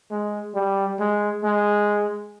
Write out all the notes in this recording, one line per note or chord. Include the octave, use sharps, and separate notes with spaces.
G#3
G3
G#3
G#3